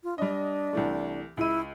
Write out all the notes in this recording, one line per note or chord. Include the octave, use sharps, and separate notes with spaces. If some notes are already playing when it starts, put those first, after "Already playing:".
F4
G3 D4 D#5
C2 E3 A3
C#2 E4 D#7